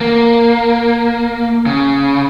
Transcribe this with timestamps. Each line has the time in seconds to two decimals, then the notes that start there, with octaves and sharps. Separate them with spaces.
0.01 A#3
1.66 C#3